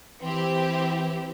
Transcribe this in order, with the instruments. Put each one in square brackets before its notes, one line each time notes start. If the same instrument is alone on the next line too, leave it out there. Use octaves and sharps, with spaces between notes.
[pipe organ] E3 [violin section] C4 E4 G4